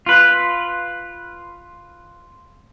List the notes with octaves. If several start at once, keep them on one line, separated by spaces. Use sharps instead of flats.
F4 B4